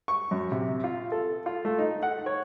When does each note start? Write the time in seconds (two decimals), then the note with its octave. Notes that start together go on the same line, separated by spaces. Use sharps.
0.08 C#6
0.31 F#2
0.52 C3
0.84 F4
1.12 A4
1.46 F4
1.65 A3
1.79 D#4
2.03 F#5
2.26 C#5